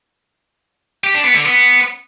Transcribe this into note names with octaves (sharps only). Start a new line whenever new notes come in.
G4
D4
B3
D3
B3